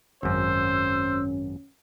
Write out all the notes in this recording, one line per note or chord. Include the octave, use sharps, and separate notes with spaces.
G#1 F#2 C#4 C5 E6